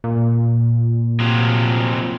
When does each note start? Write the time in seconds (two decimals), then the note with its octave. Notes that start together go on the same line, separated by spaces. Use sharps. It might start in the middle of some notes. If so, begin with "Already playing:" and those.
0.04 A#2
1.20 C3 F3 F#3